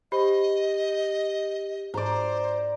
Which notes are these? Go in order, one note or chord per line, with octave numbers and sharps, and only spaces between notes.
G4 C5 D#5 B5
G#2 G#4 C5 D5 A#5